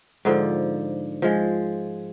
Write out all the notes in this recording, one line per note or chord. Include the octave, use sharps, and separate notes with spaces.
G#2 D3 F3
F3 G#3